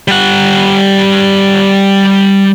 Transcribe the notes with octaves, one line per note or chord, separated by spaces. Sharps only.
G3 F#5